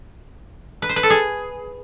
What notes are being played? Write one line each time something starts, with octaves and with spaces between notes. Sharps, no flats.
B4
C5
B4
A4
G#4